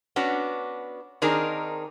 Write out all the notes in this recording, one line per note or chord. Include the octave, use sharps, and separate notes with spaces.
B3 C#4 D4 F#4
D#3 C4 D4 D#4 G#4 A#4